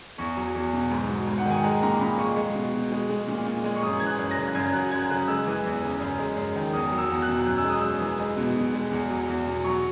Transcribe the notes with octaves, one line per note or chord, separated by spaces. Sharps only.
E2 C#6
F#3
E2
B2
G#2
F#3
G#2
F#5
D#3 G#5
G#3 A#5
A#2 A#5
A#2 B5
G#3 C#6
G#3
B2
B2
G#3
G#3
A#2
A#2
G#3
C#6
F#2 D#6
E3 G#6
F#6
F#2
A#6
C#3
F#2 G#6
F#3 F#6
F#2 G#6
C#3 F#6
G#3 E6
E3
E2
C#3
F#2
G#3
F#2
D#3
E2 D#6
F#3 D#6
E6
E2
F#6
B2
F#2 F#6
E6
G#3 D#6
F#2 E6
E3
G#3
B2
B2
G#3
E2
F#3
E2
B2
F#3 C#6